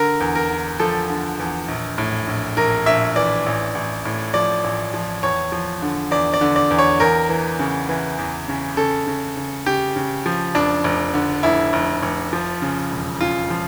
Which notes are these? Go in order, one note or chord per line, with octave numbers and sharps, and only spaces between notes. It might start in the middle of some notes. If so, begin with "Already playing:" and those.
Already playing: D3 A#4
E2
A#4
D3
F3 A4
D3
E2
A#1
A2
A#1
A#1 A#4
A#1 E5
E3 D5
A1
A1
A2
F3 D5
A1
F3
E2 C#5
F3
D3
E2 D5
D5
D3
D5
E2
C#5
E2 A#4
E3
C#3
E3
E2
C#3
C#3 A4
C#3
C#3
C#3 G4
C#3
F3
F1 D4
F1
D3
F1 E4
F1
F1
F3
C#3
E1
C#3 F4
F3